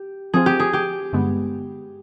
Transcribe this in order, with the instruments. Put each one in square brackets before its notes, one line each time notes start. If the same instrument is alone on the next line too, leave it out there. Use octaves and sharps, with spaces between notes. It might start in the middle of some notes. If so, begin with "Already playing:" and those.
Already playing: [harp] G4
[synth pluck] F3 C4 F4 C5 [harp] G#4
[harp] G4
G#4
G4
[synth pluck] G2 D3 G#3 B3